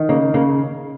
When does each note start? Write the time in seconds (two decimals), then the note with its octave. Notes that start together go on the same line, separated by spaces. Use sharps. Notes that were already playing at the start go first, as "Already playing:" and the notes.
Already playing: D#3
0.09 C#3 A#3
0.34 C#3 A#3